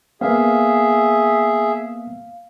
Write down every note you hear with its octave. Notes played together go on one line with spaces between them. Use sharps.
A#3 B3 G#4 E5 F5